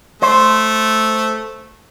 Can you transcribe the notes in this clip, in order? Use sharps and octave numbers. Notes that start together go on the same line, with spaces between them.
A3 C5